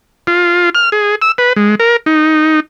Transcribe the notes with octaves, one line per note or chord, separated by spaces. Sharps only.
F4
F6
G#4
E6
B4
G#3
A#4
D#4